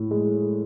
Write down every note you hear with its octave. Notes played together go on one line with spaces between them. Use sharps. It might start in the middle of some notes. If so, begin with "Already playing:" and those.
Already playing: A2
G#3